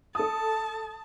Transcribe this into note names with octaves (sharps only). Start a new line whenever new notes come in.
A4 A5 D#6